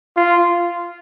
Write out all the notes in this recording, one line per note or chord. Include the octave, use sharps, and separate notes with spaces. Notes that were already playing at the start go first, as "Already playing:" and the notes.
F4